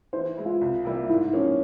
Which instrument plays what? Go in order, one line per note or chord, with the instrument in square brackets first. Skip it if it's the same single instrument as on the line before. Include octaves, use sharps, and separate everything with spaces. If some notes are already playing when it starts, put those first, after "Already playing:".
[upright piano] E3 [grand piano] C5
[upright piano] G#3 E4
[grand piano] F4
[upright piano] C2
C3 G3 A#3 E4
[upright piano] G#2 [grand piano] E4
[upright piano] F3 A#3 [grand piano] C#4